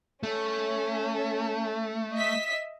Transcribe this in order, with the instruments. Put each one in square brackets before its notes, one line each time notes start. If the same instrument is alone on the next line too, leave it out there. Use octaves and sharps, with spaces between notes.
[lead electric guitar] A3 [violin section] C#4
[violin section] D#5 E5 B6